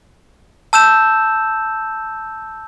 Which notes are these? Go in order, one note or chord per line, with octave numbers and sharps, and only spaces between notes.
A5 E6 G6 E7